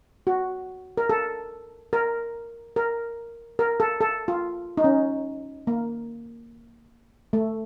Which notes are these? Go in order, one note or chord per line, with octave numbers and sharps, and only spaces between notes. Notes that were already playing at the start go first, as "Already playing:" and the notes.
F#4
A#4
A4
A#4
A#4
A#4
A4
A4
F4
D#4
C#4
A#3
A3